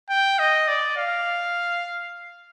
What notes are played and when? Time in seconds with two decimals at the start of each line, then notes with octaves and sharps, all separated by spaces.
0.10 G5
0.39 D#5
0.68 D5
0.97 F5